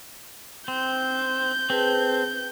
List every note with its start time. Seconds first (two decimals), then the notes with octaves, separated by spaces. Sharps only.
0.68 C4 G6
1.70 C4 G#4 B4 A5